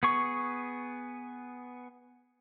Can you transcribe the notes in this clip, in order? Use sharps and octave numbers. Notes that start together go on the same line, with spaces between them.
B3 G#4 C#6